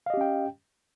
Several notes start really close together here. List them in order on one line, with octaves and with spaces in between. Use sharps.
F5 D#5 G4 C#4 G5